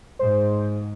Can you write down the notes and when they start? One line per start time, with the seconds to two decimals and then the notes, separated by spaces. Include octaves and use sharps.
0.19 G#2 C5